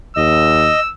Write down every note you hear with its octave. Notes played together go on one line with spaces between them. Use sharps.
D#2 D#5 E6